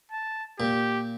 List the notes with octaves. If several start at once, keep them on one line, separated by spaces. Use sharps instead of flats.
A5
A#2 G4